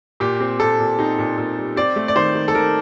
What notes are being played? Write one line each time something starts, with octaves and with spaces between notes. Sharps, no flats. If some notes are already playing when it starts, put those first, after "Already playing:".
A#2 G4
C4
A#2 A4
A#2
C4 D#4
A#2
A#2
G3
C4 D5
A3
D5
D#3 C5
D#3
A4
D#3 A#4